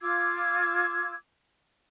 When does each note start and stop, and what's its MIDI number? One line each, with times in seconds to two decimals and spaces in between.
0.01 1.15 65
0.01 1.15 86
0.01 1.15 88
0.01 1.15 92